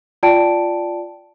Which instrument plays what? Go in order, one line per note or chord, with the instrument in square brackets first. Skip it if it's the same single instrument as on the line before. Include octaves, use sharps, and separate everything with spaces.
[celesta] F4 D5 G5 A5 D7